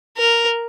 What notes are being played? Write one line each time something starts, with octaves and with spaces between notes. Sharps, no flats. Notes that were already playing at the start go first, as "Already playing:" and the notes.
A#4